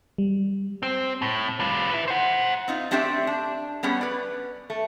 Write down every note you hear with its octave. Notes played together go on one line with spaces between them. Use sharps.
G3
C4
A2
G3 F4
B4 E5
C5 F#5
C4 D#4 F4
A3 C4 D4 G4 D5 E5
D4
G3 B3 C#4 G#4
B4 D5
A3